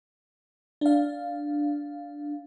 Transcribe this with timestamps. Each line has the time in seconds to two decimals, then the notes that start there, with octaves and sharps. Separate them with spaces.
0.81 D4 F5